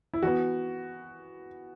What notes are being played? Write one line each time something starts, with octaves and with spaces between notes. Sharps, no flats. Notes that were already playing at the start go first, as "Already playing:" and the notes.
E4
E3 B3 F#4